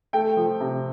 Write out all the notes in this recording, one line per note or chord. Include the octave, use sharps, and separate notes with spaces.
A3 G5
F3
C3